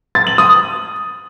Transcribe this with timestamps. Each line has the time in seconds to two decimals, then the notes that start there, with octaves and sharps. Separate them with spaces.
0.15 A6
0.27 F#7
0.38 D#6